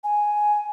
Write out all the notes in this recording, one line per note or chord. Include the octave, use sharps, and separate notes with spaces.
G#5